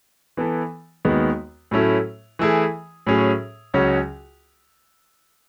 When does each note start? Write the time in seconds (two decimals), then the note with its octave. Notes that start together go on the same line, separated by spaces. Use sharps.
0.37 E3 B3 E4 A4
1.05 D#2 D#3 G#3 B3 F#4
1.71 A2 F#3 A3 C#4 E4
2.39 E3 A3 E4 G#4
3.07 A2 F#3 C#4 G#4
3.74 C#2 C#3 F#3 C#4 F#4